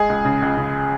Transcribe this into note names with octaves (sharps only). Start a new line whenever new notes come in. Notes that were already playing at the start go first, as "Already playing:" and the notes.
Already playing: G#3 G#4
C#2
C#3
C#2
C#3